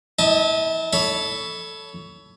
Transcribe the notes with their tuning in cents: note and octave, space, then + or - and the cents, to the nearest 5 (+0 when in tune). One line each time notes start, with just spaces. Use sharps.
E4 -35 D#5 +0 A5 +0
A4 +0 C#5 +20 B5 +0